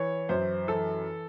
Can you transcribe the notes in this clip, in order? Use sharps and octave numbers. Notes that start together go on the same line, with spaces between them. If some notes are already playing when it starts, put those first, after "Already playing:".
Already playing: E3 C#5
F#2 C5
E3 A4